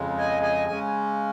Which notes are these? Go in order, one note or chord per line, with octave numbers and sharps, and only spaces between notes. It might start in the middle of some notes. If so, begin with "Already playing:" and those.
Already playing: F2 C#3 G#3
D#5 G#5
D#5 G#5
C#3 G#3 C#4 G#5